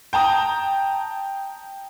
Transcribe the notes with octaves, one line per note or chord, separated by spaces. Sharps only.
G5 A5 A#5 D#6